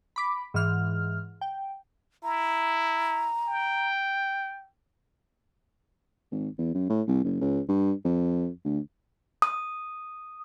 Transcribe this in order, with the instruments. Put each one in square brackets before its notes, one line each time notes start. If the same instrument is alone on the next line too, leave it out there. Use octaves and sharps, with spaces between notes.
[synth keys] B5 D6 B6
G#2 E3 F6
G5
[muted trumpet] E4 [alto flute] A#5
[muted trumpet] G5
[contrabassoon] G#1
E2
F#2
A2
C2
F#1
C#2
G2
F2
D2
[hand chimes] D#6